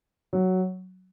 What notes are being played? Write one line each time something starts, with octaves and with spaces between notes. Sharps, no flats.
F#3